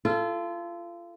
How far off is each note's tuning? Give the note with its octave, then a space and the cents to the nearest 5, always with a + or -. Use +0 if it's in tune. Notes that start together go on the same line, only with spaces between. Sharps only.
F4 -30 A4 +0